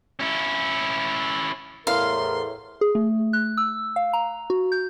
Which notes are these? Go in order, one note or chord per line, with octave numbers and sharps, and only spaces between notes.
C#4 E4
E2 A2 A#4 F5 C6
G#4
A3
F#6
E6
F5
A#5
F#4
G6